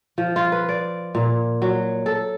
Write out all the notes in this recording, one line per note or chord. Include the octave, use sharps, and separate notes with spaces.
F3
F4
B4
D5
A#2
F#3
A4